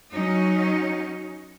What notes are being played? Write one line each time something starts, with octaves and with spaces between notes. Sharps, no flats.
F#3 C#4 D#4